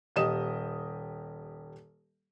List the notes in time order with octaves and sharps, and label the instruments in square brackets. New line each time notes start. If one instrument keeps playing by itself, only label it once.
[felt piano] D#1 G4 D#5 D#6 E7